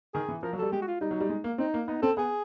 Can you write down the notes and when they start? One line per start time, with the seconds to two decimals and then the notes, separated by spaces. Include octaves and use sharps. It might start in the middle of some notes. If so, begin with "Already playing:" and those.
0.14 D#3 G#4
0.28 E3
0.43 F3 A#4
0.53 F#3
0.58 G3 A4
0.72 G#3 G4
0.82 F#4
0.87 F4
1.01 G3 D#4
1.11 F#3
1.20 G3
1.29 G#3
1.44 A#3
1.58 C4 D#4
1.74 A#3
1.88 B3 D#4
2.02 C4 A4
2.17 B3 G#4